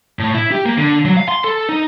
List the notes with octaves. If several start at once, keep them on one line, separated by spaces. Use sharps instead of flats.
A2
E4
G4
A#3
D3
F#3
F5
C6
A4
D#4